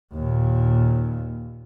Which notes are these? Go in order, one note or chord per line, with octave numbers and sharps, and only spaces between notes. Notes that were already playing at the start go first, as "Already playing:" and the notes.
D#2 A#2